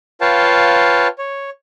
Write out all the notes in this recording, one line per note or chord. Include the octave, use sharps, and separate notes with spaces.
F4 B4 C#5 F5 G5 A5
C#5